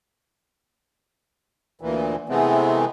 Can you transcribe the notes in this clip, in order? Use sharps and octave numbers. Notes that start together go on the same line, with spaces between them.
D2 A#2 E3
C3 E3 G#3 A3 B3 C4